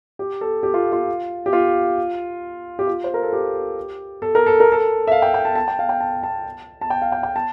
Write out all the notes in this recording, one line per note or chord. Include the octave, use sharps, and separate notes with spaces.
G4
A4
G4
F4
F4
G4
F4
G4
F4
C5
A#4
A4
G4
A4
A#4
A4
A#4
A4
E5
F5
G5
G5
A5
A5
G5
F5
G5
A5
A5
A5
G5
F5
G5
G5
A5